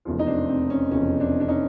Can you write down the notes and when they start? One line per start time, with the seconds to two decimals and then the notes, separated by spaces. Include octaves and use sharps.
0.05 F1 E2 C#3 F3
0.19 D#4
0.26 C4 D4
0.48 C4
0.70 C#4
0.91 F1 E2 C#3 F3 C#4
1.20 C4 D4
1.40 D4
1.48 C#4 D#4